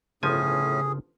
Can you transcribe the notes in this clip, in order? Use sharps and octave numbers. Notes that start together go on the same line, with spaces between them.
G1 A2 C#3 F3 C#4 G#4 G#5